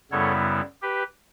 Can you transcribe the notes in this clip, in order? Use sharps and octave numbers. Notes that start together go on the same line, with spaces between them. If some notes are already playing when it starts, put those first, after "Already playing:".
F#2 C#3 G3 B3 E4 A4 C#5
G4 B4